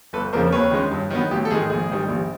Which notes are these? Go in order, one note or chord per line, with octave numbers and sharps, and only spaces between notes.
G1 A4 B4
F2 C#3 F3 A#3 A#4 C5
D#2 B4 C#5
D#3 G#3 C#4
G2
D#3 F#3 B3
A1 G4
A4
G#2 D#3 G#3 G#4
A#1 G#4
G#2 D#3 G3
A#1